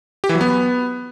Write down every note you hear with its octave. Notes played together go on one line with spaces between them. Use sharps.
G4
E3
F#3
B3